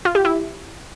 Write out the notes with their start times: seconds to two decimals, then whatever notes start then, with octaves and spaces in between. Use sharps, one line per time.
0.05 F4
0.15 G4
0.25 E4